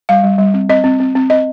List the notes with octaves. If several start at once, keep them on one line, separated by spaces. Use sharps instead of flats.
G3 F5
G3
G3
C4
C4 D#5
C4
C4
C4
C4 D#5